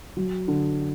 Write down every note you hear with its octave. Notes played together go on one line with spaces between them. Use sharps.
F#3
D3